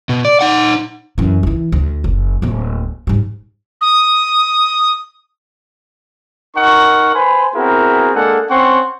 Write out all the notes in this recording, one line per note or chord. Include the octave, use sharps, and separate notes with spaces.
B2
D5
D#4 F#5
F#2 E3
E3 F3
D2
F#1
D1 A#3
G#2 G3
D#6
D#4 A#4 F#5 C#6
B4 C5 G#5 B5 C6
B3 C4 E4 F#4 G#4 A#4
G#3 A#3 D4 G#4 A4 F#5
C4 C#4 F#5 G5 C6 C#6